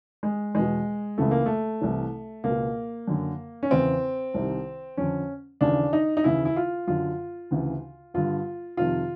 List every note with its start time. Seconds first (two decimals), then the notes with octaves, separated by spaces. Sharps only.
0.23 G#3
0.55 E2 B2 G#3
1.18 C#2 C#3 E3 A3
1.31 A#3
1.46 A3
1.81 C2 C3 E3
2.44 C#2 B2 A#3
3.07 F#2 D3
3.63 C#4
3.71 E2 C#3 E3 C4
4.34 C2 C3 D#3
4.97 F2 D3 C#4
5.61 D#2 C#3 E3 D4
5.93 D#4
6.17 D#4
6.24 D#2 C#3 E3 E4
6.45 E4
6.56 F4
6.88 F#2 D3 F4
7.51 D2 C#3 E3
8.14 G2 D3 F4
8.77 F2 C3 D#3 F4